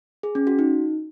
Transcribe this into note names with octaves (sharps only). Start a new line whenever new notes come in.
G#4
C#4
F#4
D#4